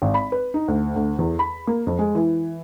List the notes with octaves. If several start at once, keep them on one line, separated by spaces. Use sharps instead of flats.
G#1
B5
B4
D#4
D2
D2
E2
B5
A#3
F2
G#3
E3